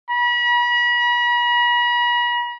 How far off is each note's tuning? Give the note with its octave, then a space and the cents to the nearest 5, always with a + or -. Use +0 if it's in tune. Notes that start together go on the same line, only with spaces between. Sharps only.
B5 -40